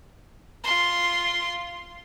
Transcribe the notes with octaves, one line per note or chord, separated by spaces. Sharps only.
F4 C6